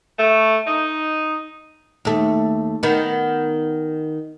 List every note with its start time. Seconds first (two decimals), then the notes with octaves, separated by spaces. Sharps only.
0.19 A3
0.67 D#4
2.05 D#2 A3
2.83 D#3 B3